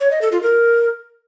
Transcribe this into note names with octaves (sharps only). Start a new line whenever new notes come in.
C#5
D#5
A4
F4
A#4